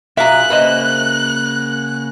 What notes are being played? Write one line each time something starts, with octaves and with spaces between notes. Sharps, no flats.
B1 E4 F4 G#4 E5 F5 A#5 F#6
C#3 A#3 F#4 B4 C5 D#5